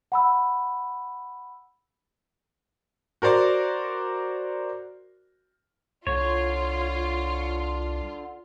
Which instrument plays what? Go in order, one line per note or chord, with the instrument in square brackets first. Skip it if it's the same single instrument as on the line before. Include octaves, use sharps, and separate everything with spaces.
[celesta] F#5 B5 E6
[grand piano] F#4 A#4 C5 D5
[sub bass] C2 [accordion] D3 [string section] F4 [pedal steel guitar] C#5